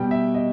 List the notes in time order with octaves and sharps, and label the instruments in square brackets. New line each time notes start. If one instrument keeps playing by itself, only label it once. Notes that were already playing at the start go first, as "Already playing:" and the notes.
Already playing: [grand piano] B2 G3 G5
E5
D#5